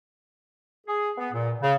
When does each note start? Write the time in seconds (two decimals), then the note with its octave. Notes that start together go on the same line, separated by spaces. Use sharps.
0.87 G#4
1.18 B3
1.33 A#2
1.61 C#3